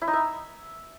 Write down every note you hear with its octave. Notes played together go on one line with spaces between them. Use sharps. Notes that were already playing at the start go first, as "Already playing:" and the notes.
E4
D#4
E5